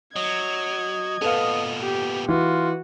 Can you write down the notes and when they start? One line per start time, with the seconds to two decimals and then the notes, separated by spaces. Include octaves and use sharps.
0.16 F#3 D#5 G#6
1.22 A#2 B3 A4 B4 F5
1.81 G4
2.29 E3 F4 F#4